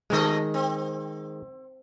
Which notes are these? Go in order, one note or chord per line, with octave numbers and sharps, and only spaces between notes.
B2 D#3 G#3 A3 D#5
C4